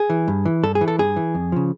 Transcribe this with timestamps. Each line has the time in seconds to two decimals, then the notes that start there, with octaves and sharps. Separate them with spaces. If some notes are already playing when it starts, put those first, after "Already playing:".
Already playing: G#4
0.10 E3
0.28 G2
0.45 E3
0.63 G2 A4
0.75 G#4
0.81 E3
0.88 A4
0.99 G2 G#4
1.16 E3
1.35 F2
1.52 C#3 F3